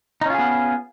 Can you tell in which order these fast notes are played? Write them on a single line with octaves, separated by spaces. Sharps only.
D#4 C#4 F4 G#4 B3